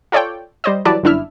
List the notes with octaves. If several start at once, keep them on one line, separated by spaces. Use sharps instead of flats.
F4 A4 C#5 D5 G5
G3 C5 D#5
E3 F#3 G3 B4 D5 A5
G1 F#2 D4 E4 E5 F6